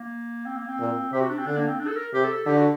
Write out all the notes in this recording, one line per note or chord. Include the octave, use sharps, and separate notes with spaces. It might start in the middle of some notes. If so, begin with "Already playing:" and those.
Already playing: A#3
C4
A#3
C4
A#2
C3 G4
F#4
D4
C4
D3 D4
A#3
C4
D4
A4
A#4
C3 G4
A4
A4
D3 G4
F#4